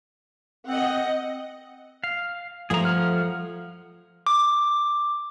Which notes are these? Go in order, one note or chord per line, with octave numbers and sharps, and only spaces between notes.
C4 D#5 F#5
F5
F3 A3 G#4 A#5
F#5 F6
D6